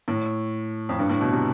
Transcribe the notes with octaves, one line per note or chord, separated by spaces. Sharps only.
A2
F2
G2
A2
B2
C3